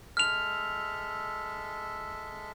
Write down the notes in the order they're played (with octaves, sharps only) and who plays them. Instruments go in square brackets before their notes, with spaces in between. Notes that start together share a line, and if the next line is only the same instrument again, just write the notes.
[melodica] G#3 A4 E5 [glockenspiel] F6 F7